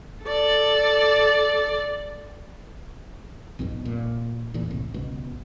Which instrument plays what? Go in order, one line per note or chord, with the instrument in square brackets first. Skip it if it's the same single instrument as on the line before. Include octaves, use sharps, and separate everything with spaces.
[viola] A4 D5
[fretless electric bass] B1 F2 G#2 B2
A#2
E2 A#2
C2 A2
G1 C#2 B2